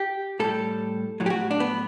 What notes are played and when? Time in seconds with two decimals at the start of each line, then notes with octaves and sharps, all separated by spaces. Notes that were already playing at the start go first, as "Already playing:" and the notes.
Already playing: G4
0.40 A2 G3 A4
1.20 A2 F#3
1.26 G4
1.30 F#4
1.51 D4
1.60 B3